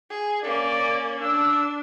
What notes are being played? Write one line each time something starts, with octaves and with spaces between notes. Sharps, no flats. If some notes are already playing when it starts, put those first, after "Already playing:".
G#4
A#3 C#4 D5
D4 E6